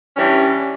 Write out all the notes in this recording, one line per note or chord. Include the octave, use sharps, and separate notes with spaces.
G2 E3 G3 C#4